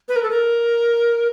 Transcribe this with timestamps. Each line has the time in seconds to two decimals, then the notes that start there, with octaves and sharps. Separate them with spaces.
0.09 B4
0.16 A#4
0.23 A4
0.30 A#4